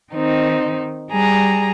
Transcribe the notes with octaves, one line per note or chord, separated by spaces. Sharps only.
D#3 C4 D#4
G3 G#4 A#5